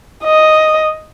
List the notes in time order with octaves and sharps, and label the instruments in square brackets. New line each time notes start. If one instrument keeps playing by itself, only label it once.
[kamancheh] D#5